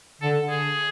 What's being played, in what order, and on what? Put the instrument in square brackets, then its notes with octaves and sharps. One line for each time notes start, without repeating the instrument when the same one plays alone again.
[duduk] D3 [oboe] A4
[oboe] G#4